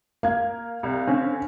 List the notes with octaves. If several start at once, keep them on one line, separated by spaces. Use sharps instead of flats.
A#3 F5 G#6
C2
D3 C4 C#4